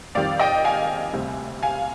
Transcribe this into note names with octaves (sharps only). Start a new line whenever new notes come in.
F2 D#3 G3 D5 F5
D#5 G5
F5 G#5
D2 C3 G3
F5 G#5